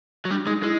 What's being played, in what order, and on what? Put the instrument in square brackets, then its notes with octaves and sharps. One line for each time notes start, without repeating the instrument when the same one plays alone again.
[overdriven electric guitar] F#3
[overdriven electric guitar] G3 [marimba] D4
[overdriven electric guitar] G#3 [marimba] D#4
[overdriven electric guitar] G#3 [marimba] E4